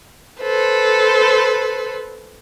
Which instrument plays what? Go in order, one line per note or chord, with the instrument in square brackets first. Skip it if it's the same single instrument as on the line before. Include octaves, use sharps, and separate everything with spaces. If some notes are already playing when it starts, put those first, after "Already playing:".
[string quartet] A4 B4 C5